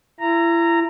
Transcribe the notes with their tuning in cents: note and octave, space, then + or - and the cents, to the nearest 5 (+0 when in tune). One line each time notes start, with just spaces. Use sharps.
E4 +35 A#5 -10